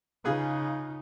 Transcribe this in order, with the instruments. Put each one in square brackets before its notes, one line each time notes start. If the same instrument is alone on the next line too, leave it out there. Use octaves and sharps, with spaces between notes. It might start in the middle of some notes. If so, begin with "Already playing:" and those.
[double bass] C#3 D#4 [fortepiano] F4 G#4 B4